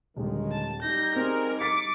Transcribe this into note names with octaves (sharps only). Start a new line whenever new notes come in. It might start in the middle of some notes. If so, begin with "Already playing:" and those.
D#1 D3 D#3 G#3
A5
G3 D#4 G6 A#6
C4 G#4 A#4
D6 A6 B6 C#7